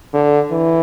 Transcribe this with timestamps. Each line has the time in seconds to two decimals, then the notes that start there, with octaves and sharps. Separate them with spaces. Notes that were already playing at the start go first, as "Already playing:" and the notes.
0.13 D3
0.51 E3